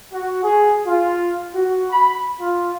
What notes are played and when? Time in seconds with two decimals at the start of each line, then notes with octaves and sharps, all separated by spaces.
0.13 F#4
0.43 G#4
0.86 F4
1.55 F#4
1.91 B5
2.40 F4